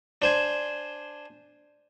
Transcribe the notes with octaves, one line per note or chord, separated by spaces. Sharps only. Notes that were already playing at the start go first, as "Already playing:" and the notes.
D4 C5 G#5